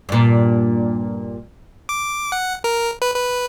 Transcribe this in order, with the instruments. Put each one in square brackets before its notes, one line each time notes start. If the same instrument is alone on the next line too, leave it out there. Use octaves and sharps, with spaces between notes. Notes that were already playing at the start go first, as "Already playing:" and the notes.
[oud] G2 A#2
[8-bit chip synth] D6
F#5
A#4
B4
B4